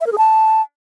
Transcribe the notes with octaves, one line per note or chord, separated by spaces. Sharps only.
E5
A#4
G#4
A5